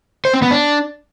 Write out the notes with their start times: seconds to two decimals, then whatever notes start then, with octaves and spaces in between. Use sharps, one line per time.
0.25 C5
0.34 C4
0.42 B3
0.51 D4